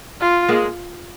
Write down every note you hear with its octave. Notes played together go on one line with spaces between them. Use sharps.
F4
G#3 A#3